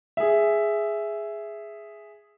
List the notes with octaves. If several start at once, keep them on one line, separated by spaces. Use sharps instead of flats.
G#4 E5